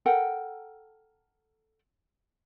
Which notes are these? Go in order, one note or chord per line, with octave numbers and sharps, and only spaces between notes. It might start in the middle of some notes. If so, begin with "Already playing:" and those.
A4 A#4 F#5 G5